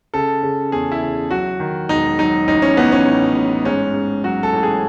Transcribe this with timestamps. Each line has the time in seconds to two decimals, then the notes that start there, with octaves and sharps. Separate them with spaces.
0.14 C#3 A4
0.43 C#3
0.72 E2 G#4
0.92 E4
1.01 C#3
1.31 F#3 F#4
1.60 D#3
1.89 E1 D#4
2.19 F#3 D#4
2.48 A1 D#4
2.62 C#4
2.77 A1 B3
2.92 C#4
3.06 A2
3.35 A1
3.65 G#2 C#4
3.94 G#2
4.24 F#3 F#4
4.43 A4
4.53 A1
4.63 G#4